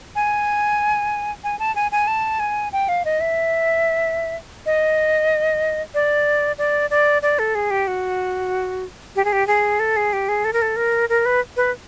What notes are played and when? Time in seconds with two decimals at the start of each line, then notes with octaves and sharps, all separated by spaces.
0.16 G#5
1.44 G#5
1.59 A5
1.76 G#5
1.92 G#5
2.07 A5
2.40 G#5
2.73 G5
2.89 F5
3.05 D#5
3.20 E5
4.66 D#5
5.94 D5
6.58 D5
6.90 D5
7.22 D5
7.39 A4
7.55 G#4
7.70 G4
7.88 F#4
9.16 G4
9.25 G#4
9.33 G4
9.47 G#4
9.80 A4
9.96 G#4
10.13 G4
10.29 G#4
10.45 A4
10.53 A#4
10.62 A4
10.76 A#4
11.09 A#4
11.26 B4
11.57 B4